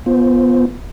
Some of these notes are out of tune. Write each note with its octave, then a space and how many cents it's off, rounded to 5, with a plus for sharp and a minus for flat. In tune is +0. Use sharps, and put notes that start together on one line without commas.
B3 -5 F4 +0 C5 +0